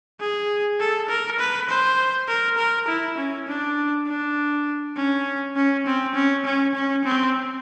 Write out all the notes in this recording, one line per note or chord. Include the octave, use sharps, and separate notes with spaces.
G#4
A4
A#4
B4
C5
A#4
A#4
E4
C#4
D4
D4
C#4
C#4
C4
C#4
C#4
C#4
C4